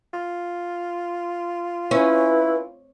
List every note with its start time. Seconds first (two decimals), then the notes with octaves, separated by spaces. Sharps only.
0.14 F4
1.91 C#4 E4 B4